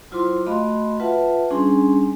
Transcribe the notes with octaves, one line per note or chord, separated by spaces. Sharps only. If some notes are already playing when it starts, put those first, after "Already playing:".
F#3 E4 F4 C5 C6 D6
A3 F#4 D#5 F5 B5 C6
F4 B4 E5 F#5 A5
G3 C#4 D4 G#4 G#5 C6